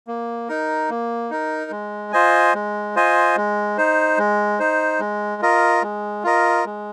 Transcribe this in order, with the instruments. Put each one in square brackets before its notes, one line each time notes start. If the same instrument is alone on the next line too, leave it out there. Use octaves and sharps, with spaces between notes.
[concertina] A#3
D#4 A#4
A#3
D#4 A#4
G#3
F4 C5 D#5 G#5
G#3
F4 C5 D#5 G#5
G#3
D#4 C5
G#3
D#4 C5
G#3
F4 A#4 D#5
G#3
F4 A#4 D#5
G#3